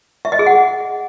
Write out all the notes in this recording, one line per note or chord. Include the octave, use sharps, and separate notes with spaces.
E5
D#5
G#4
F#5